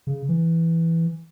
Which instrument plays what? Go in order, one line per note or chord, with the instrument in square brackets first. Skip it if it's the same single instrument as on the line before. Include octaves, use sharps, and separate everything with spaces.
[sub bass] C#3
E3